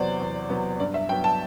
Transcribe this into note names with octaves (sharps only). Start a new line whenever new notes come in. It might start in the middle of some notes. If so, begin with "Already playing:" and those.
Already playing: E2 C3 F#3 B3 C5 D5
E2
C3 F#3 B3
G2 D5
E5
F#3 B3 G5
A5